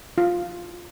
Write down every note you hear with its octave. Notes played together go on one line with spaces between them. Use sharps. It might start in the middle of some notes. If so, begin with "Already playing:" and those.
F4